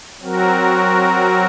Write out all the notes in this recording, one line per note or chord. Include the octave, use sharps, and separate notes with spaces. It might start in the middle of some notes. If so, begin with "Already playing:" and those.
F#3 C4 F#4 A#4